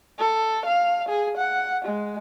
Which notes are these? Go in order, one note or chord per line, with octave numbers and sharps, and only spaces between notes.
A4
F5
G#4
F#5
G#3